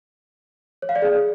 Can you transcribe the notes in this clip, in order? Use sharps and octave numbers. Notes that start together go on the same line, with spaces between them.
C#5
F5
D5
G#4